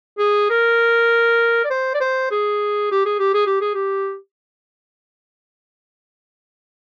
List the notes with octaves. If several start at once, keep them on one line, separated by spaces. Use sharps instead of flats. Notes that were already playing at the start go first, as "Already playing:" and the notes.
G#4
A#4
D5
C5
D5
C5
G#4
G4
G#4
G4
G#4
G4
G#4
G4